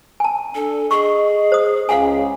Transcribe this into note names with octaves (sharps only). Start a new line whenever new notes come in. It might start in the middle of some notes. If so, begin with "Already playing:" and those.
G#5 A5
D4 A4
G#4 D#5 C#6
C5 D#6
C#2 G#4 F5 F#5 G#5